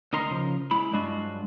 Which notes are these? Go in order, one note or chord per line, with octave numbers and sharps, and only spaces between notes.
D2 D#4 A#4 A#5 C6
C#3 F3
G#3 E4 B5
G2 F#3 G#3 D4 F4 F#4